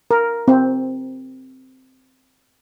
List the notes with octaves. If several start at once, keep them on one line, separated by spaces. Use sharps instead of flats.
A#4
C4